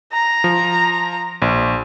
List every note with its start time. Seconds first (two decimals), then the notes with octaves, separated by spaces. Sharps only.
0.12 A#5
0.44 F3
1.42 A#1